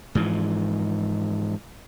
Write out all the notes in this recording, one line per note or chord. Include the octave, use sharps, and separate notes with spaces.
G#2 E3 F3